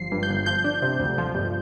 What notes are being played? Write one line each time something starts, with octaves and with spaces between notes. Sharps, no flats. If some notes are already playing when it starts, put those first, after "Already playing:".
Already playing: G1 F3 C7
G2
G6
G1
F3 G6
D4
C3
D2
F3
G1